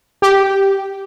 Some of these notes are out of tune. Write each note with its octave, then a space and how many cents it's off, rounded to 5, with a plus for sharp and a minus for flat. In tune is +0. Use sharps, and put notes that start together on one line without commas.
G4 -5